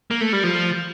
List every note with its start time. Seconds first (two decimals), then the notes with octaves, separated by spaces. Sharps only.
0.11 A#3
0.21 A3
0.33 G3
0.43 F3